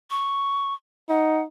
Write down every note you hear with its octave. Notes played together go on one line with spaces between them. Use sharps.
C#6
D#4 F#5